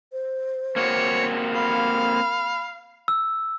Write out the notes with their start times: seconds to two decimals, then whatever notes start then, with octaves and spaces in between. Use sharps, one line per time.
0.12 C5
0.76 A#3 C4 F#4 C#5
1.55 F5 B5
3.08 E6